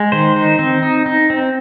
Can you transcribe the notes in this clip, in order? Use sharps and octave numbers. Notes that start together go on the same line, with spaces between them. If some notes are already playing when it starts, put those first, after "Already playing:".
Already playing: G#3
D#3 C5
D#4
C4
D#4
D#4
C4